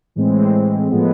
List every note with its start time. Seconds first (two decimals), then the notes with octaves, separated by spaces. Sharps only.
0.16 A2 E3 G#3 C4
0.90 A2 F3 G#3 B3